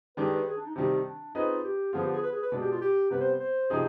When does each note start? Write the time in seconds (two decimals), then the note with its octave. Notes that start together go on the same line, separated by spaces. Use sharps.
0.17 D#3 G#3 D4 G4 B4
0.32 B4
0.47 G#4
0.57 D4
0.66 D#4
0.76 C3 D#3 G3 D4
1.05 D4
1.35 C4 D#4 F4 G#4 B4 D#5
1.64 G4
1.93 D3 F3 B3 F4 G#4
2.03 G4
2.13 G#4
2.23 B4
2.32 G#4
2.42 B4
2.52 B2 G#3 D4
2.62 G4
2.72 F4
2.81 G4
3.11 C3 G3 B3 B4
3.20 C5
3.40 C5
3.70 C3 F3 C4 D#4 G#4